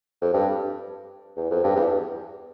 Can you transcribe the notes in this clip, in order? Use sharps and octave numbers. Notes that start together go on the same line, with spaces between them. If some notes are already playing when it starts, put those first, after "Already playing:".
F2
G2
E2
F2
G2
E2